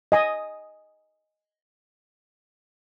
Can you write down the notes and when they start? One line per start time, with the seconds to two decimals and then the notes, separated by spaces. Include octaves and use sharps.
0.12 D#5 G#5 D#6